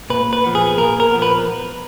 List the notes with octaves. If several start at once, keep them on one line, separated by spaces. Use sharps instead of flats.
A#2 B4
B4
F3 B3
G#4
A#2 A#4
A#4
F3 B3
B4